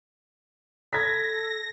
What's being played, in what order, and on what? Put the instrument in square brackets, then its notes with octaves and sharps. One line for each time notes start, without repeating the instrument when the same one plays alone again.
[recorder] A4 [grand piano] G#6 B6 [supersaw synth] A#6